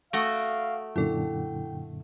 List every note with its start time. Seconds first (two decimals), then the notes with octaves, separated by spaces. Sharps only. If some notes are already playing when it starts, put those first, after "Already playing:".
0.13 A3 F#4 F5 D#6 D7
0.96 F#2 A#2 D3 E4 A4 G5